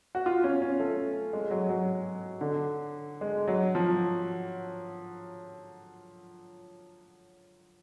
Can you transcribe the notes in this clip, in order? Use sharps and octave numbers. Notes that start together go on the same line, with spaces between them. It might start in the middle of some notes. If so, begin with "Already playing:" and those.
F#4
F4
C#4
C#4
A3
G#3
F#3
F#3
D3
G#3
F#3
F3